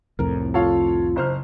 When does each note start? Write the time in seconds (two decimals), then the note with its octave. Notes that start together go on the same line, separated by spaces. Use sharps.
0.19 C2 F2 A2 A#4
0.54 F4 A4 C#5 F5
1.16 F#1 C5 F6